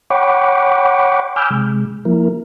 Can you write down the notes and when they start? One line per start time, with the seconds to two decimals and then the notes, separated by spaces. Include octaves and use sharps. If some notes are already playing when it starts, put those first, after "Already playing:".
0.10 C#5 F#5 G5 B5 C#6 D6
1.36 G#5 B5 D6 E6 F6 G6
1.50 C3 G#3
2.05 F3 A#3 E4 A#4